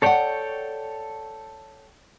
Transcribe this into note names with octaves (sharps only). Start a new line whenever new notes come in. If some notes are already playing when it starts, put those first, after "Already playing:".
A4 C#5 D5 F#5 G5